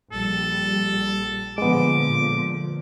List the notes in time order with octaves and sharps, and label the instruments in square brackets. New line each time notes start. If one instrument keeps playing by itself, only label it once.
[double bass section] A#1 G3 [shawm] A4
[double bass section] A#2 D3 F3 [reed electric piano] G#3 B3 [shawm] D6